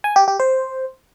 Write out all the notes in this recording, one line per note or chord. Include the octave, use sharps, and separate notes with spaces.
G#5
G4
G4
C5